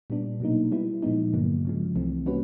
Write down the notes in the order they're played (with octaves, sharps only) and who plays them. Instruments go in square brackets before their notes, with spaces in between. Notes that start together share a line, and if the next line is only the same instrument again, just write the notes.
[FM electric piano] A#2 G3 B3 D4
B2 F#3 A#3 D#4
G3 B3 E4
A#2 F3 G#3 B3 D#4
G2 D3 F#3 A#3
C#3 F3 G#3
C2 C3 E3 A3 C4
G3 A#3 C#4 F#4 B4